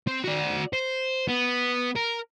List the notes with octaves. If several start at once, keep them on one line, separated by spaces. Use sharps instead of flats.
C4
F#4 D5
C5
B3
A#4